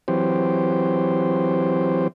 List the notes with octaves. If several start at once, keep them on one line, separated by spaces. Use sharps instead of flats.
E3 F#3 C4 G4 C5